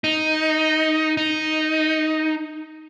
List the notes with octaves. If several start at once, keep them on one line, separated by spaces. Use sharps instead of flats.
D#4
D#4